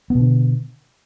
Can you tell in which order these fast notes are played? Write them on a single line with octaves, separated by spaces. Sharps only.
B3 B2 D3